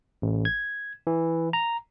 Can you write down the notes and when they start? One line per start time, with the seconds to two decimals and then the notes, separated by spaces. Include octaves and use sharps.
0.22 A1
0.45 G#6
1.07 E3
1.53 A#5